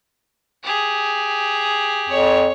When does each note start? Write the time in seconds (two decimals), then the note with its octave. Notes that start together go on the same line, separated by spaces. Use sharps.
0.63 G4 G#4
2.09 F2 C#5